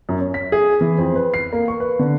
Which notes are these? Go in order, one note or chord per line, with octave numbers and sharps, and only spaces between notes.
F#2
C#4
B6
G#4
E3
F2
B4
C7
A#3
C#6
B4
D3